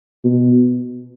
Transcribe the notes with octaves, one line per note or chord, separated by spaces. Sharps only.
B2